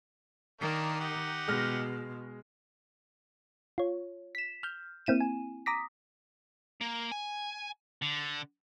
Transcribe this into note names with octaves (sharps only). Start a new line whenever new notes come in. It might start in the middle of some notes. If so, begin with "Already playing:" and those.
D#3 A#3 D4
D#4 G4 F#5
B2 G#3 F6 A#6
F4 C#5
B6 E7
F6 G6
A#3 C4 E4 D#7 E7
G#5
A#5 D6 D#6 A#6 B6
A#3
G#5
D3